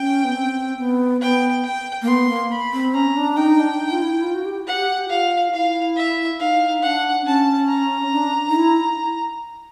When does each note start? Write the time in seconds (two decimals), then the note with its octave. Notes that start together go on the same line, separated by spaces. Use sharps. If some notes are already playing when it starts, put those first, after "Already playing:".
Already playing: C#4 G5
0.24 B3
0.35 C4
0.79 B3
1.21 B3 G5
1.64 G5
2.02 A#3
2.08 B3 C6
2.30 A#3
2.52 B5
2.73 C4
2.94 C#4 A#5
3.16 D4
3.37 D#4 G5
3.59 D4
3.81 D#4
3.92 F4
4.02 E4
4.23 F4
4.35 F#4
4.45 G4
4.67 G4 F#5
5.09 F4 F5
5.53 E4 F5
5.96 E5
6.40 D#4 F5
6.82 D4 F#5
7.26 C#4 A5
7.69 A#5
8.12 D4
8.50 D#4
8.56 E4